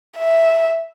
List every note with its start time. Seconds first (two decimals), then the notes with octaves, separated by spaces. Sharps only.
0.17 E5